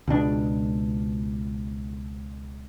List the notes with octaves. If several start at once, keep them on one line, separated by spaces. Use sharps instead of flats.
C#2 B2 D4